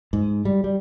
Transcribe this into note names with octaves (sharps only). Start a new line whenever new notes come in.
G#2
G3
G3